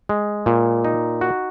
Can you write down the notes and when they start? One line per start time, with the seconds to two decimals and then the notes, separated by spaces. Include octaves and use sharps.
0.09 G#3
0.46 A#2
0.85 D#4
1.21 F#4